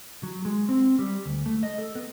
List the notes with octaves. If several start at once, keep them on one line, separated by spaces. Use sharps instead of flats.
F#3
G#3
C4
G3
D2
A3
D#5
A4
B3